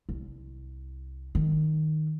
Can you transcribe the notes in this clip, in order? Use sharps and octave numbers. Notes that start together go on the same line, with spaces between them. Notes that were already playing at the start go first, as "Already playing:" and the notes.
C2
D#3